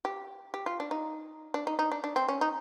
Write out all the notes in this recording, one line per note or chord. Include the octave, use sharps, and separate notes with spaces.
G4
G4
F4
D4
D#4
D4
D#4
D#4
D4
D4
C4
C#4
D#4